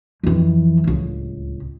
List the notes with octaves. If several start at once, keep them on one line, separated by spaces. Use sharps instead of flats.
F2 E3
D1 C#2